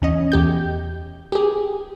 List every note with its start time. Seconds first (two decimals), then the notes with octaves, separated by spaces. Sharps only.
0.02 E2 C#4 D#5
0.32 E2 G4 G6
1.32 G4 G#4